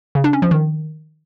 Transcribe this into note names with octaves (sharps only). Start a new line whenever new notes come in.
C#3
D4
C#4
F3
D#3